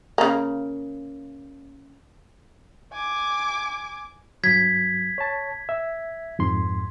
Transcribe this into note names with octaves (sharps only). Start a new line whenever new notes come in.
C#3 A#3
G#5 D6
G2 F#3 G#6 B6
C#5 A5
E5
F2 G#2 C6